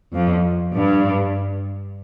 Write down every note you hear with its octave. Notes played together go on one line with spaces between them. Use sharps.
F2
G2